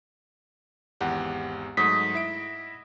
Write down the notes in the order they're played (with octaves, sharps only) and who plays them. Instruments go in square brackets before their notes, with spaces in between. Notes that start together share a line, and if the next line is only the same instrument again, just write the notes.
[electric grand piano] G#1 E2 G4 [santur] F#5
[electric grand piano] G#2 F#3 A3 [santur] D#5 [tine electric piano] B6
[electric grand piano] E4 E5 D7